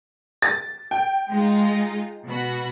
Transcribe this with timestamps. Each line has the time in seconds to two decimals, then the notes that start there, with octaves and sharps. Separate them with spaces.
0.42 A6
0.91 G5
1.30 G#3 D#4 F4
2.27 B2 F#4 B5